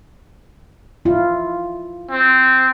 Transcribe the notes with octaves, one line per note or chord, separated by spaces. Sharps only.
E4 F4
C4